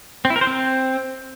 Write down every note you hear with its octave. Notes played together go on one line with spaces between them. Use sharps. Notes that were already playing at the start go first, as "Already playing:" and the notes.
C4
E4
A#4
C5
C4